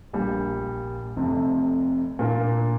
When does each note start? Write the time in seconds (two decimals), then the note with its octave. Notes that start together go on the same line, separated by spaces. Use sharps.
0.13 A#1 A#2 G3
1.17 F1 F2 C3
2.19 A#2 A#3 D4 F4